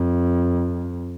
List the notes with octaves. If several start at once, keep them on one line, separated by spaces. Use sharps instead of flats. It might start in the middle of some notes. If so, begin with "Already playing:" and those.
Already playing: F2